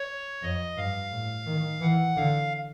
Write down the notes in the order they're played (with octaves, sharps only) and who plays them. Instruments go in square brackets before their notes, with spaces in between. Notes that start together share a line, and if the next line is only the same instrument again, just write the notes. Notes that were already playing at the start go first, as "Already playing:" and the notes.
Already playing: [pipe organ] C#5
[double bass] F2 [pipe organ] D#5
[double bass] G2 [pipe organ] F5
[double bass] A2
D#3
[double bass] E3 [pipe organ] F#5
[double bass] D3 [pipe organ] F5